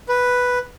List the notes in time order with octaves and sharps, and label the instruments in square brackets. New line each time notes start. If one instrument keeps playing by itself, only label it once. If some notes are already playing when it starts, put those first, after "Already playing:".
[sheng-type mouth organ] B4